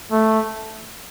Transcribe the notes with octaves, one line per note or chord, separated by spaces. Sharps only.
A3